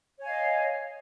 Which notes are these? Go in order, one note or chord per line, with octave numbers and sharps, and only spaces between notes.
C#5 D#5 F5 G#5